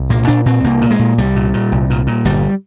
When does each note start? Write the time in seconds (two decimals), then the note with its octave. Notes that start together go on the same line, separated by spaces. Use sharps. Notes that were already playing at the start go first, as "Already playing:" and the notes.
Already playing: C2
0.10 A#2 A#3
0.27 A#2 D4
0.46 A#2 C4
0.64 C2 A#3
0.81 A#2
0.91 G#3
0.99 A#2
1.18 C2 G3
1.35 A#2
1.54 A#2
1.72 C2
1.90 A#2
2.07 A#2
2.25 G1 G3